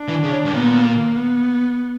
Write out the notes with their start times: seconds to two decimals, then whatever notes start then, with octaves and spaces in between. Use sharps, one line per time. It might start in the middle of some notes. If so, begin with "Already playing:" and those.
Already playing: D4
0.08 E3
0.24 C#3
0.45 G2
0.54 A#2 B3
0.85 A#3
1.16 B3